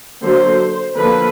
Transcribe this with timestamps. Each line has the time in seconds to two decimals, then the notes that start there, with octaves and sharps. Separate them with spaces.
0.23 D3 F#3 A#3 C5
0.97 D3 F3 A#3 B4